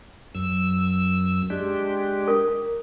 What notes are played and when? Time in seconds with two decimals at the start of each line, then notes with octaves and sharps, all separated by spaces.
0.35 F#2 E6
1.50 G#3 D4 G4
2.28 A#4